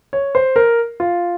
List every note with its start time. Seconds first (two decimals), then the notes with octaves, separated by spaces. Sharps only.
0.13 C#5
0.35 C5
0.56 A#4
1.00 F4